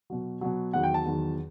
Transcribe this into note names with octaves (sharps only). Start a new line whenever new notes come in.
B2 F#3
B2 F#3
E2 D#3 F#3 F#5
G5
A5
E2 D#3 F#3